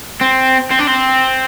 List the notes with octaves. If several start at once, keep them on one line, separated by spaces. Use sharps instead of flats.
C4
C4
D4
C4